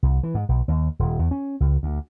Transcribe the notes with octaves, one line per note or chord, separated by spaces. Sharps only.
C2
E3
G#2
B1
D#2
D#1
E2
C#4
C#2
D2